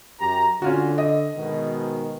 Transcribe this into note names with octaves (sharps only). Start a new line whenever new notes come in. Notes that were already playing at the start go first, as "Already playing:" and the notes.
F#2 G4 A#5
D3 C#4 F4 F#4
D#5
G#2 B2 D#3